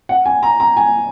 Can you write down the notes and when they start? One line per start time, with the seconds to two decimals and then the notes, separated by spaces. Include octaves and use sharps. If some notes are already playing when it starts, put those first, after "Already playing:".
0.09 F#5
0.26 G#5
0.43 A#5
0.60 A#5
0.77 G#5